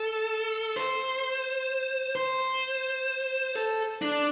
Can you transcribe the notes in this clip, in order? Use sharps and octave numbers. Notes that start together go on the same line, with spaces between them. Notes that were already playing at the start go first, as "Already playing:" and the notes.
Already playing: A4
C5
C5
A4
D4